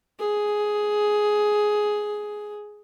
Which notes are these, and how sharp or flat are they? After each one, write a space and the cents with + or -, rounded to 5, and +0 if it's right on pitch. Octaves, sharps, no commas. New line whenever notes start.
G#4 +10